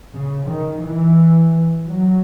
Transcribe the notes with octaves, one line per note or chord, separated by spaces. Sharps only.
C#3
D#3
E3
F#3